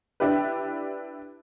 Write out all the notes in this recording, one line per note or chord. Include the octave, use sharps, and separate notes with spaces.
D4 E4 G4 B4